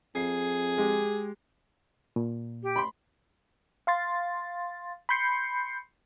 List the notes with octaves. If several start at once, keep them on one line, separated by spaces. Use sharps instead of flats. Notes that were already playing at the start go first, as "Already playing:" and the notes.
F2 G#4 C7
G#3 G4
A#2
G4
B5 C6
F5 C6 A6
B5 C6 G6 C7 C#7